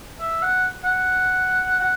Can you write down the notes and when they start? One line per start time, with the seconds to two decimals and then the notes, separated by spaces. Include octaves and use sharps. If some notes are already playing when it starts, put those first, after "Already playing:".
0.20 E5
0.42 F#5
0.84 F#5
1.80 F#5